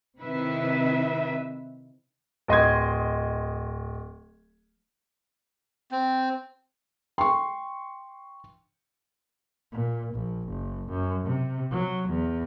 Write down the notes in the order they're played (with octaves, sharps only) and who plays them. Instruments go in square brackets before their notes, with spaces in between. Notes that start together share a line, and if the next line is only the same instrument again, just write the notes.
[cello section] C3 D#3 E4 B4 E5
[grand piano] D1 D#5 C6 G#6
[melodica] C4
[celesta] G5 [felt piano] C6 C#6
[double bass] A#2
A#1
F#1
F#2
C3
F#3
E2